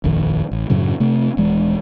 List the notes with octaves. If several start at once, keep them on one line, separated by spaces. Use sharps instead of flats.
D#1 A#1 F2 D#3
A1
F#2 A2 C#3 F#3
C3 A3 C4
D#1 E3 G#3